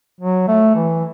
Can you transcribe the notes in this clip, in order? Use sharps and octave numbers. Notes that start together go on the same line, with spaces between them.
F#3
A3
E3